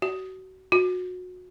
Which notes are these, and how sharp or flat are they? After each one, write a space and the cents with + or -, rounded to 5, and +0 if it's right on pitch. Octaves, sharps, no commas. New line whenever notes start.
F#4 +30
F#4 -25